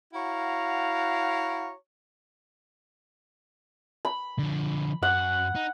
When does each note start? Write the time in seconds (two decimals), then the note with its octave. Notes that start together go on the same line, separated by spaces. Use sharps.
0.14 E4 F#4 C#5 F5 F#5 A#5
4.05 B5
4.39 D3 F3
5.03 F#2 F#5
5.55 D#4